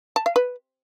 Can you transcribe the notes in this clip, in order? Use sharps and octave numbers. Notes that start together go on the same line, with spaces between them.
A5
F5
B4